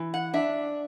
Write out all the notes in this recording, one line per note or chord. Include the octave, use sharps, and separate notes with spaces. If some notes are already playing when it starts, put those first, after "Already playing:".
Already playing: E3
F#5
D4 E5